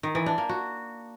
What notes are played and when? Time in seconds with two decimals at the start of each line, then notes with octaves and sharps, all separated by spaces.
0.03 D#3
0.15 E3
0.26 D4
0.38 A#3
0.49 F#4